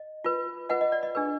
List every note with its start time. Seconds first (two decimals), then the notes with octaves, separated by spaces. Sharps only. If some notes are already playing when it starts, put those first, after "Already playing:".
Already playing: D#5
0.24 F4 B4
0.69 F4 B4 D#5 F#5
0.81 D#5
0.92 D5
1.03 D#5
1.15 D4 G#4 B4